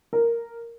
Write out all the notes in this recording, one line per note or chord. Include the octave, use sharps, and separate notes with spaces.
A#4